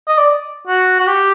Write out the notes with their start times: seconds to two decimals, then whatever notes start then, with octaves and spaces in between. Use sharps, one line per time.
0.08 D#5
0.18 D5
0.67 F#4
1.00 F#4
1.07 G4